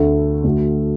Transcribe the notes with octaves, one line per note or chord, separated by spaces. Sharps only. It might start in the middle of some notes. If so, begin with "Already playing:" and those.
Already playing: D2 D3 A3
D2 D3 A3 F#4